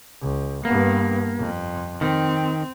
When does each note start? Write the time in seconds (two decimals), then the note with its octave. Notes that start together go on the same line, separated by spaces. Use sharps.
0.21 C#2
0.65 G2 A#3 B3
1.39 F2
2.01 D#3 C4